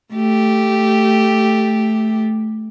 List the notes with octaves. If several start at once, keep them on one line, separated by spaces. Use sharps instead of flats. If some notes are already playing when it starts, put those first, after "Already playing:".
A3 G4